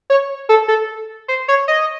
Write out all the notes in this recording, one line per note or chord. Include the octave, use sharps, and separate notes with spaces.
C#5
A4
A4
C5
C#5
D#5